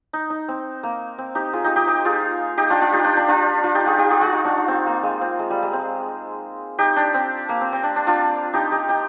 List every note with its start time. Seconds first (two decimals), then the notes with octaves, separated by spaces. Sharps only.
0.13 D#4
0.30 D#4
0.48 C4
0.83 A#3
1.18 C4
1.35 D#4 G4
1.53 F4 G#4
1.64 D#4 G4
1.76 D#4 G4
1.87 D#4 G4
2.05 F4 G#4
2.58 D#4 G4
2.70 D4 F4
2.81 D4 F4
2.93 D#4 G4
3.04 D4
3.17 D4
3.28 D4 F4
3.64 D4 F4
3.75 D#4 G4
3.86 F4 G#4
3.98 D#4 G4
4.10 F4 G#4
4.21 F4 G#4
4.33 D#4 G4
4.45 D4 F4
4.57 D#4
4.68 C4
4.87 A#3
5.03 G#3
5.21 C4
5.39 G#3
5.50 G3
5.63 G#3
5.73 C4
6.78 D#4 G4
6.96 D4
7.14 C4
7.49 A#3
7.61 C4
7.72 C4
7.83 D4
7.96 D4
8.07 D4 F4
8.53 D#4 G4
8.72 D#4 G4
8.89 D#4 G4